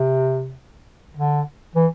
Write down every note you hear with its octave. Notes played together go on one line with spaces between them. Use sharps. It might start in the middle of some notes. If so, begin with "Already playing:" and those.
Already playing: C3
D3
E3